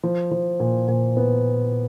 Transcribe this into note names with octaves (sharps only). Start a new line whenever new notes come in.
F3
F3
A#2
A#2
B3